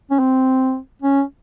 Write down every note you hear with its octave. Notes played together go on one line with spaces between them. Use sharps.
C#4
C4
C#4